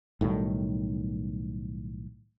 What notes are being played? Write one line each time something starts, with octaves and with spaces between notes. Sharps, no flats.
B1 A2 D#3 G3